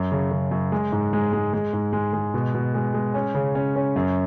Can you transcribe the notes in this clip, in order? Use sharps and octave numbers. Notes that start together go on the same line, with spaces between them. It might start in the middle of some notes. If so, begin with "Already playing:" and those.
Already playing: F#2
C#3
C#3
F#2
G#3
G#2
G#3
G#3
G#3
G#2
G#3
G#3
B2
B2
G#3
G#3
C#4
C#3
C#4
C#4
F#2